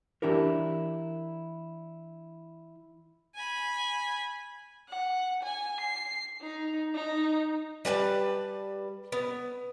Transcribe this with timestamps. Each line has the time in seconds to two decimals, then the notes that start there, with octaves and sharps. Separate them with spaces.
0.22 E3 D4 E4 G4 A#4
3.35 G#5 B5
4.88 F#5
5.43 G#5
5.81 C7
6.41 D#4
6.95 D#4
7.85 G3 B4 G#5 A5
9.12 B3